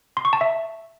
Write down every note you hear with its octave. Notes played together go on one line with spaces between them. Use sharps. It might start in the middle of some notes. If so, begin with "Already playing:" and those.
C6
C#6
A5
E5